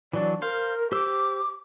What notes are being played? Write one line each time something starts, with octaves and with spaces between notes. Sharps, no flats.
E3 F#3 D4 D5
A#4 C5 F5
G4 C5 D6 E6